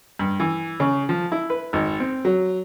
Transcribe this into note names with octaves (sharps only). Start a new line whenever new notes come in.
G2
E3
C#3
F3
E4
B4
G#1
C4
F#3